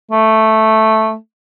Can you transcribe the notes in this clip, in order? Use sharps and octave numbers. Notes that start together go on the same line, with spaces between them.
A3